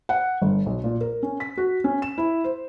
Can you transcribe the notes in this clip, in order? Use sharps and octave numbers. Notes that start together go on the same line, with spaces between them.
F#5
G1
B1
A#2
A#4
C#4
B6
F#4
C#4
E7
E4
C5